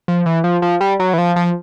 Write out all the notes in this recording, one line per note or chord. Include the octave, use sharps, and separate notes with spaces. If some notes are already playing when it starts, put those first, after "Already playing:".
F3
E3
F3
F3
G3
F#3
E3
F3
F3